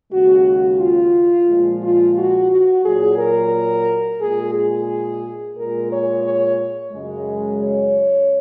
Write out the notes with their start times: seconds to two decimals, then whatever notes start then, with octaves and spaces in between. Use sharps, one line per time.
0.11 D#2 C#3 G#3 F#4
0.46 F#4
0.79 F4
1.48 A#2 F3 G#3
1.82 F4
2.16 F#4
2.50 F#4
2.84 A#2 F#3 G#4
3.18 A#4
4.20 A#2 G#3 G#4
4.54 G#4
5.56 A#2 G#3 A#4
5.90 C#5
6.24 C#5
6.92 F#2 C#3 G#3
7.61 C#5